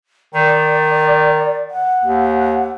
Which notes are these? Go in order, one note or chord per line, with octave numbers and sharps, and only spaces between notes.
D#3 D5
F#5
D#2